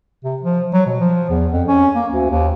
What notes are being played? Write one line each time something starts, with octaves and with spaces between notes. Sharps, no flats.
C3
F3
F#3
B2
F3
E2
F2
C#4
A#3
D2
D#2